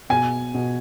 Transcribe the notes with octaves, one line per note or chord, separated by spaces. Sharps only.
B2 G#5
B2